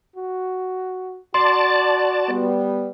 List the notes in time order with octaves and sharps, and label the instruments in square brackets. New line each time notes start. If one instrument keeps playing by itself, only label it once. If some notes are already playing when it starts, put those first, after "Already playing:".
[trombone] F#4
[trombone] F#4 [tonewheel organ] D5 A5 [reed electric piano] C6
[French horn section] G3 B3